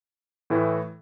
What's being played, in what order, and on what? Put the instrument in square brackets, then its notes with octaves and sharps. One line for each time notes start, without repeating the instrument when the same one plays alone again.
[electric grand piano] A2 E3 A3 E4